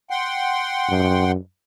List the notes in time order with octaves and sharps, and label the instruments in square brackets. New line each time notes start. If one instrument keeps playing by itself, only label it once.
[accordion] F#5 G5 C6
[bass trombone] F#2